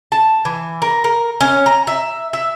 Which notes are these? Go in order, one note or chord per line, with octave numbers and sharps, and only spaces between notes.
A5
E3
A#4
A#4
C#4
A#5
E5
E5